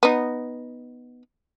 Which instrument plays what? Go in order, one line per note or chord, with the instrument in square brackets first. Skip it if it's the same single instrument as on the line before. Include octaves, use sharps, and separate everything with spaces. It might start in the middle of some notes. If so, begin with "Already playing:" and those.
[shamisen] B3 D#4